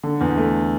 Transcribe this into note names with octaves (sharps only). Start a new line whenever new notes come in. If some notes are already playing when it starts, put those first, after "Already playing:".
D3
E2
A3